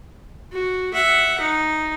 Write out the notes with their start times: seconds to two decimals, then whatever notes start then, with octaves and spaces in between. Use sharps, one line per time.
0.52 F#4
0.94 E5 F#5
1.41 D#4